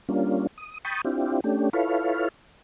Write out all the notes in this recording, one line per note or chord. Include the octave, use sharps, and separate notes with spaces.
G3 A#3 C#4 D4 F4
D#6
G5 A5 B5 C#6 D#6
C4 D4 E4 F4 G4
A3 C#4 D4 G4
E4 F4 A4 B4 C#5 F5